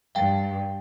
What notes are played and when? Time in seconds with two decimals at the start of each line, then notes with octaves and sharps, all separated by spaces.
0.15 G2 F5 G5